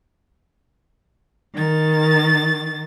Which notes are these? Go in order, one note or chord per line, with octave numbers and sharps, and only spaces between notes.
D#3 A6